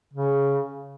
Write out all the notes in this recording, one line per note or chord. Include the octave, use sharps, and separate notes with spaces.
C#3